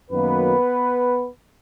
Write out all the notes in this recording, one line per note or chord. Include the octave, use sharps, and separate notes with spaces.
F#2 D#3 F#3 A#3 B3 B4